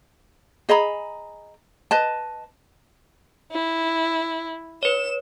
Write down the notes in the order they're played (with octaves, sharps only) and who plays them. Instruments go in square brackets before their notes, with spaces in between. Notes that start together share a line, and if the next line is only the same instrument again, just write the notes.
[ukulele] G#4 D#5 A#5 B5
B4 D#5 A5
[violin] E4
[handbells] B4 C#5 [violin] E7